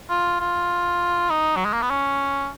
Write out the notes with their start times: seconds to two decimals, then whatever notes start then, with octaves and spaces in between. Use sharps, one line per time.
0.10 F4
0.40 F4
1.30 D#4
1.56 F#3
1.65 G#3
1.73 A#3
1.82 B3
1.90 C#4